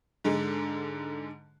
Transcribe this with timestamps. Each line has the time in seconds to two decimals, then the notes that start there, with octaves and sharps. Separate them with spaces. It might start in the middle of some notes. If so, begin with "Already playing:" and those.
0.24 G#2 D3 G#3